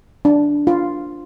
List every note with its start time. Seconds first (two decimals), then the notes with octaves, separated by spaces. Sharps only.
0.25 D4
0.67 F4